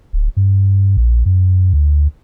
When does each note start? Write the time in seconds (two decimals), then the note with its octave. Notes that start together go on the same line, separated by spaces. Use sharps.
0.13 D1
0.37 G2
0.97 A#1
1.26 F#2
1.73 D2